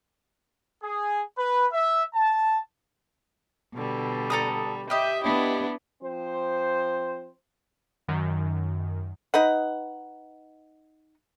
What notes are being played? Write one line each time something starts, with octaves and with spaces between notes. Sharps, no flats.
G#4
B4
E5
A5
B2 D3 G3
A4 A#5 D#6
G4 D#5 E5
B3 D4 E4
F3 C4 C5
F#2 D#3
D#4 B4 F#5